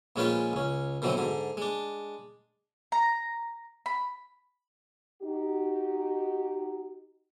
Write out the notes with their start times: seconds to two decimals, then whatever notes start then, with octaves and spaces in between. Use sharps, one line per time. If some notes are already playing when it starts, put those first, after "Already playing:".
0.16 A#1 G#3 C#4 F4 B4 G5
0.53 C#2 C#4
1.02 B2 D3 E3 F#3 C4
1.17 G#2 D3
1.57 G#3 D4
2.92 A#5
3.86 B5
5.22 D#4 F#4 G4